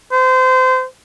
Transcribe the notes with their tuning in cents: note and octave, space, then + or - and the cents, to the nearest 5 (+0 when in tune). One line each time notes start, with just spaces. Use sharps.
C5 -25